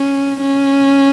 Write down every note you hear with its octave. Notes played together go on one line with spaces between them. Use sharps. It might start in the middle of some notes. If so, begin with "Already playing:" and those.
Already playing: C#4
C#4